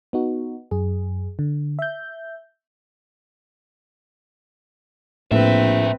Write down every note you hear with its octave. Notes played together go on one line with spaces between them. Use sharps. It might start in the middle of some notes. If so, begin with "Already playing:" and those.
B3 D#4 F#4
F#2 G#4
D3
E5 G6
A#1 A2 A#3 C4 B4 E5